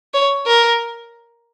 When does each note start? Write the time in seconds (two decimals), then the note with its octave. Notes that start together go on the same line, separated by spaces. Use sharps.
0.14 C#5
0.46 A#4